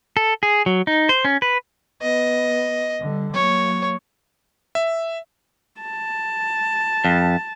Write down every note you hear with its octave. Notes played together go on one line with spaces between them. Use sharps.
A4
G#4
F#3
D#4
C5
C#4
B4
B3 D#5
D3 G3
F#3 A#3 C#5
E5
A5
F2